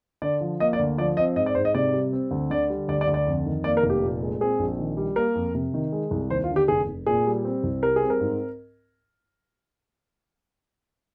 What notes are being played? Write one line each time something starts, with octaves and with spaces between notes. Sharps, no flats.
D3 D5
F3
A#3 D#5
D5
D2
F3 D5
C4 D#5
G#2 D#5
D5
G#2 C5
D#5
C3 D5
G3
C4
D2
D3 D5
G3
D2 D5
D5
D2
D5
F2
D#3
A#3 D5
A#4
F1
G4
A#2
G#3
C4 G#4
A#1
D#3
G3
A#3 A#4
F2
C3
D#3
G#3
C2
D#2 C5
F4
D3
G4
F1 G#4
F1
A#2 G#4
G3
C4
C2
G3 A#4
G#4
C4
A#4
G#2